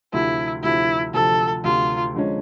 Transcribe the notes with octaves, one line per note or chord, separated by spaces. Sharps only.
D2 C3 F3 E4
D2 C3 F3 E4
D2 C3 F3 A4
D2 C3 F3 F4
D3 F3 G#3 C#4